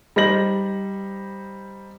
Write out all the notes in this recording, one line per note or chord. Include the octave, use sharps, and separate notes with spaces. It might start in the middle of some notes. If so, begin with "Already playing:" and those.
G3 D#4 C5 A#6 F#7